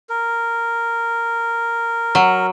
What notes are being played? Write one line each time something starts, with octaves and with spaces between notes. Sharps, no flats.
A#4
F#3